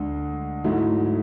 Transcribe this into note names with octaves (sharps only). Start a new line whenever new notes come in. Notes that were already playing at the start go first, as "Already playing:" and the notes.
Already playing: D2 D3 G#3
G#2 F#3 A3 E4